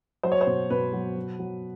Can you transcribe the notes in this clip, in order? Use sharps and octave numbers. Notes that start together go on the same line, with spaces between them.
F#3 C5
C#5
C5
B2
B2 B4
F#3
F#3
F#3